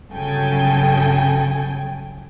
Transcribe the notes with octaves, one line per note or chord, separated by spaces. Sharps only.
G1 C#3 F#3 A4 G5 G#5